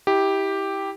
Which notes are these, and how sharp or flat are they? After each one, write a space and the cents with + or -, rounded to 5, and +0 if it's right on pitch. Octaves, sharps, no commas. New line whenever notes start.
E4 -25 G4 +0